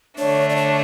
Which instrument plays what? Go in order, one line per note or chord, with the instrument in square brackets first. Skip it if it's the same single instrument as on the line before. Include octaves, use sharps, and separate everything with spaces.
[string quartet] D3 A3 D4 [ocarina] C#5
[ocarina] D5
C#5